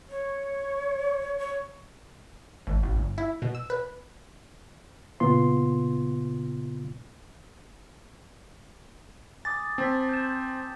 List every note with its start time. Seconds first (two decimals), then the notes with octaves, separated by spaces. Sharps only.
0.09 C#5
1.38 C#5
2.67 G#1
2.83 A1
2.97 G1
3.18 E4
3.42 B2
3.55 E6
3.70 B4
5.20 A#2 C#3 B3 F4 C6
9.45 G#5 D6 D#6 A6
9.78 C4 A5 A6 B6
10.09 G6 A6 E7